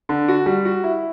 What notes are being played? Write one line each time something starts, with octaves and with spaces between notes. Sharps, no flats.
D3
F#4
G3
F#4
E4